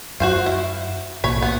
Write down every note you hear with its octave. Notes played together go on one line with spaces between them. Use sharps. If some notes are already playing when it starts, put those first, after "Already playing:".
F#2 F#3 F#4 C5 F5
E4
B1 A2 A#3 C#5 B5
B3